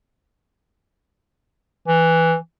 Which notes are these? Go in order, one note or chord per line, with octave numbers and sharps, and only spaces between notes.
E3